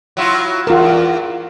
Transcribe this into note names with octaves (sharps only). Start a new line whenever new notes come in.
F#3 E4 F4
E2 F4 A#4